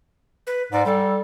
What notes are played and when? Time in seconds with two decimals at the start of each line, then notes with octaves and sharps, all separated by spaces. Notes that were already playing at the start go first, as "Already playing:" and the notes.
0.47 B4
0.72 G#2 D5
0.86 G3 A4